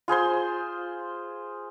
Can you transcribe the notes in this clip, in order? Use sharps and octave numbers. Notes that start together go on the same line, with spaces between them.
F4 G#4 C5 C6